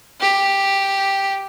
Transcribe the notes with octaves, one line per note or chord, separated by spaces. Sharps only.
G4